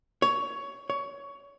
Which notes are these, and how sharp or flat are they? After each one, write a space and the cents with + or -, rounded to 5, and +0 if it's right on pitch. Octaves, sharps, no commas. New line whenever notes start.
C#5 +15
C#5 +20